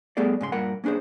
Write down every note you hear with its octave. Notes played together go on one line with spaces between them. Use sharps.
G3 A3 B3 G#4 A4 D5
G#2 C#3 C6
G2 A#2 A#4 F#5 B5
A#3 C#4 D4 G#4 C5